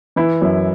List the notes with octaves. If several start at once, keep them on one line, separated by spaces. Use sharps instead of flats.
E3 E4
F#2